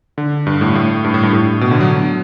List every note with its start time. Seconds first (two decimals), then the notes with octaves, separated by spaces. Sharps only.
0.18 D3
0.47 G2
0.61 A2
0.75 A2
1.04 G2
1.14 A2
1.23 G2
1.33 A2
1.61 B2
1.71 D3
1.81 F#3